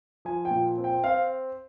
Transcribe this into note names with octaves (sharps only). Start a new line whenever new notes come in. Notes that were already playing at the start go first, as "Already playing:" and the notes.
F3 G#5
G5
A#2
C4
G5
C4 F5